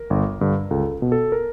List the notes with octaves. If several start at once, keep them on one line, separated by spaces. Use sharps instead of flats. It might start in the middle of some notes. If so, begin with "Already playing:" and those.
Already playing: A#4
G1
G2 D3
C#2 A4
B2
A4
A#4